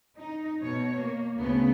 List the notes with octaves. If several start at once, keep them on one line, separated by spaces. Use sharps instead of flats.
D#4
B2 C#5
A#3
D2 C#3 B3